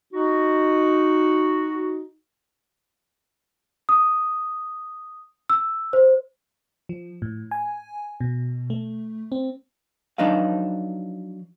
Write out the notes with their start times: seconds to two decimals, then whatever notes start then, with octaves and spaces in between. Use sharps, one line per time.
0.14 D#4 F#4
3.89 D#6
5.49 E6
5.93 C5
6.89 F3
7.22 A2
7.51 G#5
8.20 B2
8.70 A3
9.32 C4
10.18 F3 F#3 D4 D#4 B4 F5